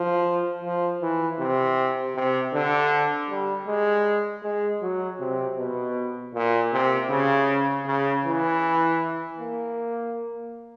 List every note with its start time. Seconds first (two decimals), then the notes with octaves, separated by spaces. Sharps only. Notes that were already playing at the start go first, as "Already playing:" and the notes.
Already playing: F3
0.63 F3
1.02 E3
1.39 C3
2.15 C3
2.54 D3
3.30 G3
3.67 G#3
4.43 G#3
4.82 F#3
5.20 C3
5.58 B2
6.34 A#2
6.73 C3
7.10 C#3
7.87 C#3
8.24 E3
9.38 A#3